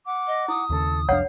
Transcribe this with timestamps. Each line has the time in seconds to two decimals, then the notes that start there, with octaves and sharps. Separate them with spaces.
0.06 F#5 D6
0.27 D#5
0.48 E4 D#6
0.70 D#2 C#3 A4
1.09 C2 F2 D4 C#5 F5 F#5